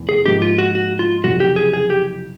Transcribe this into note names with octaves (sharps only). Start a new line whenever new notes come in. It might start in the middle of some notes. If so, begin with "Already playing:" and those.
Already playing: F1 E2
G#4
G#2 F3 A#3 G4
F4
F#4
F#4
F4
F#1 F2 C3 F#4
G4
G#4
G#4
G4